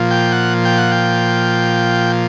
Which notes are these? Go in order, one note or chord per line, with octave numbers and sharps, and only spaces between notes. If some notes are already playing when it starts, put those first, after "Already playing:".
Already playing: A#2 F3
G5
F#5
G5
F#5
G5